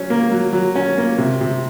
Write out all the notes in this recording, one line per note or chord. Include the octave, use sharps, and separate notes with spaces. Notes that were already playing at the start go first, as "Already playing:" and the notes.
Already playing: F#3 C#4
A#3
F#3
F#3
C#4
A#3
C3
C3